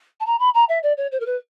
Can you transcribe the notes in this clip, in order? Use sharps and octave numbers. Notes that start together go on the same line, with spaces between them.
A5
A#5
B5
A#5
E5
D5
C#5
C5
A#4
B4